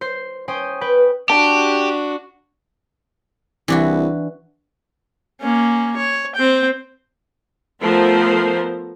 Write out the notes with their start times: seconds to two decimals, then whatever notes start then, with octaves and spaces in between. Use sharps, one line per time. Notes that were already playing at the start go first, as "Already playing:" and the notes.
0.01 C5 C7
0.48 C#4 C5 G5 D#6
0.81 B4 G5
1.29 D4 F#4 G4 A5
3.68 C2 E3 D4 F#4
5.41 A#3 C#4
5.96 C#5
6.35 C4 G5
7.81 F3 A3 B3 A#4 C5